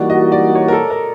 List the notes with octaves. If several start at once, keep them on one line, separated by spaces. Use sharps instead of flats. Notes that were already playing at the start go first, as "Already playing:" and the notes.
Already playing: E3 G3 A#3 D#4 F#4 D5
D#5
D5
C#5
A#4
A4
A#4